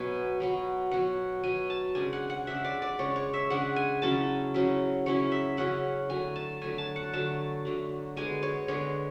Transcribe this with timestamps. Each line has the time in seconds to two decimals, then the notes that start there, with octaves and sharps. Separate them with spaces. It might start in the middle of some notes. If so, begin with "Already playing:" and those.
Already playing: B2 F#3 B3 G#5
0.40 B2 F#3 B3
0.91 B2 F#3 B3 F#5
1.44 B2 F#3 B3 G#5
1.70 A5
1.95 C#3 G#3 D4 G#5
2.13 F#5
2.30 F#5
2.47 C#3 G#3 D4 E5
2.65 D5
2.82 D5
2.99 C#3 G#3 D4 C#5
3.16 C#5
3.34 E5
3.50 C#3 G#3 D4 F#5
3.76 G#5
4.02 C#3 F#3 C#4 E4 A5
4.54 C#3 F#3 C#4 E4
5.06 C#3 F#3 C#4 E4 C#5
5.32 E5
5.57 C#3 F#3 C#4 E4 F#5
6.09 D3 F#3 A3 G#5
6.36 A5
6.61 D3 F#3 A3 G#5
6.78 A5
6.96 F#5
7.13 D3 F#3 A3 A5
7.65 D3 F#3 A3
8.17 D3 G#3 B3 G#5
8.43 C#5
8.68 D3 G#3 B3 C#5